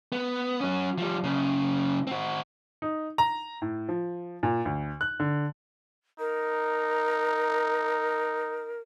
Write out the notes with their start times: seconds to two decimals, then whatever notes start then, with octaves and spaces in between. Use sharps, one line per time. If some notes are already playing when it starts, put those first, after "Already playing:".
0.12 B3
0.61 F#3 C#4
0.98 F3 G3
1.24 F#2 C#3
2.07 C4 F#4
2.82 D#4
3.18 A#5
3.62 A2
3.89 F3
4.43 A#2
4.65 D2
5.01 F#6
5.20 D3
6.19 D#4 A#4